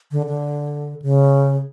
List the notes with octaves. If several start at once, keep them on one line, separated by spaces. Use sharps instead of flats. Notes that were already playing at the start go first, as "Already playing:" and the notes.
D3
D3
C#3